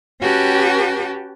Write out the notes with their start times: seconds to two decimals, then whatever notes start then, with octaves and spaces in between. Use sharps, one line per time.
0.21 C#4 F#4 G4 B4 G5 A5